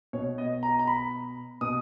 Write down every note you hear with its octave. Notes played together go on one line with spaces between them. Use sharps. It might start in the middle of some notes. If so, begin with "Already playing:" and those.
B2 C#5
D#5
A#5
A#5
B5
B2 D#6